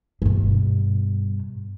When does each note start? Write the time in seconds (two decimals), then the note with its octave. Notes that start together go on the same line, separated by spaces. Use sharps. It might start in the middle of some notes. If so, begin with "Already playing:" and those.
0.22 G2 B2